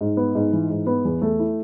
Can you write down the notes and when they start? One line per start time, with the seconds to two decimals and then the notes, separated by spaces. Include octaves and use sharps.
0.01 G#2
0.17 B3
0.35 G#2
0.53 E3
0.70 G#2
0.87 B3
1.05 E2
1.22 A3
1.39 E4